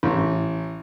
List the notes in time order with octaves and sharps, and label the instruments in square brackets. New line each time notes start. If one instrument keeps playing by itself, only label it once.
[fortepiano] A1